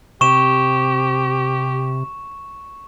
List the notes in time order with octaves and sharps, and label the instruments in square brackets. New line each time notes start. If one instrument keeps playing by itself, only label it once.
[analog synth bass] C3 [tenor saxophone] G4 [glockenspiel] C#6 E7